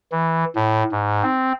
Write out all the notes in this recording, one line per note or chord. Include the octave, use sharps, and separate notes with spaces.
E3
A2
G#2
C4